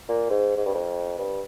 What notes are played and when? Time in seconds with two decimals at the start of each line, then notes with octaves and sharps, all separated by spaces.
0.09 A#2
0.30 G#2
0.57 G#2
0.65 G2
0.74 F2
1.18 G2